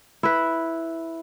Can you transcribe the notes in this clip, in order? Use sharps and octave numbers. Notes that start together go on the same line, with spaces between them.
E4 B4